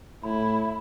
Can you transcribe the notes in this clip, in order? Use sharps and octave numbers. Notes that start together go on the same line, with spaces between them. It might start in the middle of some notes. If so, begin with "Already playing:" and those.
A2 E4 B5